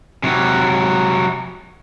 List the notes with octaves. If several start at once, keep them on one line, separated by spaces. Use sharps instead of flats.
C3 F#3